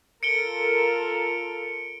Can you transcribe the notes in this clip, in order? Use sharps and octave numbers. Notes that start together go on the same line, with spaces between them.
F4 A4 A#4 C#7 D7 G7